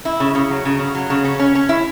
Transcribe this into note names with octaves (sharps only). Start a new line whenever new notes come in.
E4
C#3
C#3
F#3
C#3
C#3
F#3
C#3
C#4
C#4
C#4
E4